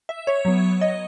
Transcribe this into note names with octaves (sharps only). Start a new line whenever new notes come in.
E5
C#5
F#3 B3
D#5